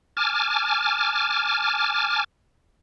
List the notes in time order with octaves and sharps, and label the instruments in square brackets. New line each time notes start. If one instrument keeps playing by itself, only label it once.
[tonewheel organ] G#5 A5 D6 F6